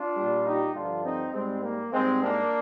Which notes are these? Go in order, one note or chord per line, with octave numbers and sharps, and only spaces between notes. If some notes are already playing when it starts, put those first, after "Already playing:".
Already playing: D4 F4
A#2 G3
D#4 G4
G2 D3 F3 D4 F4
C4 D#4
G#2 G3 G#3 C4
A#3
G#2 G3 G#3 C4
A#3 D4